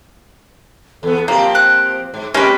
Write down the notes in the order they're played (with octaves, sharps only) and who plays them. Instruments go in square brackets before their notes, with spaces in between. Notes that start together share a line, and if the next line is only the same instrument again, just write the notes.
[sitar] E2 B3 [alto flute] A4
[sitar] F3 C4 G4 [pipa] A#3 [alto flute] F5
[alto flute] C5 [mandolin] F#6
[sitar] G#2
[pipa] G#3 B4 [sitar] A#3 C4 [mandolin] C#4 [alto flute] G4